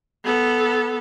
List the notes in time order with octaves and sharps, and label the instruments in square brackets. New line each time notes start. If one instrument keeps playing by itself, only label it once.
[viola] B3 A4